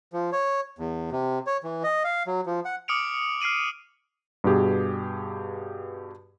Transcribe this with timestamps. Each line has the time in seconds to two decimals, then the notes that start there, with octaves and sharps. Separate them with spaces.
0.13 F3
0.32 C#5
0.79 E2
1.12 C3
1.47 C#5
1.64 E3
1.84 D#5
2.04 F5
2.27 F#3
2.46 F3
2.65 F#5
2.88 D6 D#6 F6 C#7 D7 F7
3.41 F6 C7 D7 D#7 F#7
4.44 G2 B2 G4 G#4